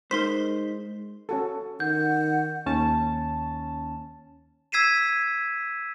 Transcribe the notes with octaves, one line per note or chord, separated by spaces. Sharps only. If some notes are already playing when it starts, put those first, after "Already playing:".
G#3 D#4 A#4 C5 C6 B6
C#4 F#4 A4
D#3 F#5 G6
D#2 C#4 A5
E6 G#6 B6 C7 D#7 E7